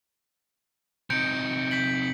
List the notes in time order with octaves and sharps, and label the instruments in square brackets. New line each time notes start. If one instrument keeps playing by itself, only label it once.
[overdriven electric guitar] C3 D#4 [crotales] G6 C#7 D7
[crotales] G6 B6 F#7